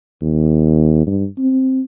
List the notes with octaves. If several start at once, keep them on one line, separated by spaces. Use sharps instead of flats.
D#2
G2
C4